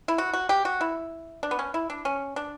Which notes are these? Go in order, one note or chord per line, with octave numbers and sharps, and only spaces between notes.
E4
F#4
F#4
G4
F#4
E4
D4
B3
C#4
E4
D4
C#4
D4